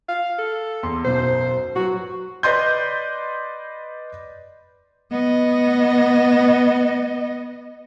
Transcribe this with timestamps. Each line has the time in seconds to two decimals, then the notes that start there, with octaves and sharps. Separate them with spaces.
0.09 F5
0.39 A4
0.83 E2 C6
1.04 B1 F#2 B2 C5
1.76 F#3 F#4 B4
2.43 B4 D5 D#5 C6 G6
5.11 B3 D#5